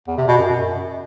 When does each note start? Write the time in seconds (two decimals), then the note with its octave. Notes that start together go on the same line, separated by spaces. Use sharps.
0.08 E2
0.18 C3
0.28 B2
0.38 F#2
0.48 F#2